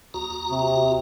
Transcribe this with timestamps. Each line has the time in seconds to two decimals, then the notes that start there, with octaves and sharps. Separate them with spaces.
0.14 D#2 F#4 A#5
0.51 C3